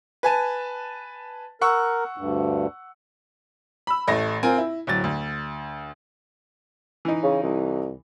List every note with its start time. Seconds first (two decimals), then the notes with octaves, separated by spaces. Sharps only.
0.23 B4 G#5 A5
1.61 A#4 F#5 C#6 E6
2.18 D2 G2
3.87 B5 E6
4.08 A1 A3 A#6
4.43 C4 F4 A#4 G#5
4.58 E4
4.87 D1 F#3 A6
5.04 D2
7.05 E3 D#4
7.23 C#3
7.43 C2